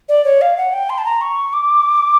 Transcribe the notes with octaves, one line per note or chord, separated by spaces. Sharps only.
D5
C#5
F5
F#5
G5
C6
A5
A#5
C#6
D6